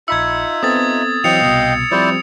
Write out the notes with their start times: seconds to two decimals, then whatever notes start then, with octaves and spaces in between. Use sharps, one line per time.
0.08 A#1 D#4 F4 E5 B5 E6 G#6 C#7
0.63 B3 C4 A4 D#6 A6
1.24 E3 F#3 C4 D#5 F5 G5 C#7 F7
1.41 C2 B2
1.91 F3 G3 C4 E4 C5 D5